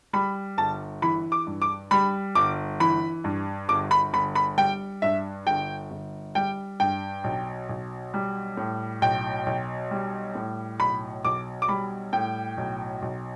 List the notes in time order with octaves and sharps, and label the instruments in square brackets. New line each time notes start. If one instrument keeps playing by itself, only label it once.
[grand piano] G3 B5
G1 A5
E3 B5
D6
G2
D6
G3 B5
G1 D6
E3 B5
G2
G1 D6
B5
G1 B5
B5
G3 G5
G2 E5
G1 G5
G1
G3 G5
G2 G5
B1
B1
G3
A2
B1 G5
B1
G3
A2
B1 B5
B1 D6
D6
G3 B5
A2 G5
B1
B1